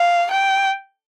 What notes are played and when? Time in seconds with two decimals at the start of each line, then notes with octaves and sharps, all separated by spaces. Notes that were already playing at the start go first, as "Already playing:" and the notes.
Already playing: F5
0.31 G5